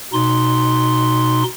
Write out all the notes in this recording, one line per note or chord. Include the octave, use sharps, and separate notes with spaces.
B2 D#4 C6